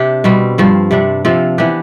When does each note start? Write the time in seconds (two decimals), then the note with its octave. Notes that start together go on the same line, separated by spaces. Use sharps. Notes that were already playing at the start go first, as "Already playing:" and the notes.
Already playing: C3 D4 G4
0.24 B2 G3 C4
0.58 G2 F3 C4
0.91 C3 G3 D4
1.25 C3 F3 C4 F4
1.58 E3 B3 D4 G4